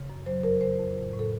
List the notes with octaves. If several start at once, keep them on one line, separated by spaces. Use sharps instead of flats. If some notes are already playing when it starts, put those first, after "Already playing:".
Already playing: C#3
F#2
F#3 C5
F2 A#4
C#3 C5
F2
A2
A2
A4